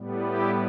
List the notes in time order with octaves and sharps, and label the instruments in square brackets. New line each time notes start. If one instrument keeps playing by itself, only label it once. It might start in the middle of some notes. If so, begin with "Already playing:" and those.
Already playing: [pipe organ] A2 G3 B3
E4 G4